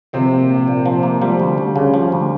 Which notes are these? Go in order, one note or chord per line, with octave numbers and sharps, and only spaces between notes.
C3 F3 C4
A#3
A#1
A#2
F3
A#3
F3 G3
D2
D2
C#3
F3
D2